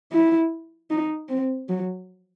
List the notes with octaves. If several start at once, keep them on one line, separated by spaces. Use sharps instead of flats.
E4
D#4
C4
F#3